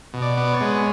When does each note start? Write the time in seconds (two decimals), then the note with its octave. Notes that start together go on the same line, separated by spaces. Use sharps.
0.14 B2
0.22 D5
0.37 B3
0.53 C#5
0.61 G#3